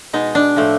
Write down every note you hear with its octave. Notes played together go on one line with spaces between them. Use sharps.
B2 G#3 D#4
D4
A2 F3 A3